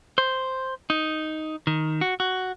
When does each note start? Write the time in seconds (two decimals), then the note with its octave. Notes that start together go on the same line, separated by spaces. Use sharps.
0.18 C5
0.90 D#4
1.67 D#3
2.01 F#4
2.20 F#4